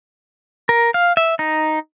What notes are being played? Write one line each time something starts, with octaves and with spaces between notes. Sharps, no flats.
A#4
F5
E5
D#4